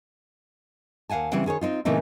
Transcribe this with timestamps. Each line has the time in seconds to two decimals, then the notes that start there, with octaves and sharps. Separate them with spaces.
1.09 D#2 F5 F#5 G#5 A5
1.32 C#3 E3 G3 C4 C#5 F#5
1.46 D#3 G#4 C5 C#5
1.61 C4 D#4 F4
1.85 A#2 C#3 E3 A3 C4 D#4